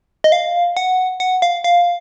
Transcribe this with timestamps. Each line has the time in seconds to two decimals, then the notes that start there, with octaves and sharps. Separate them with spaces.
0.24 D#5
0.32 F5
0.77 F#5
1.20 F#5
1.42 F5
1.64 F5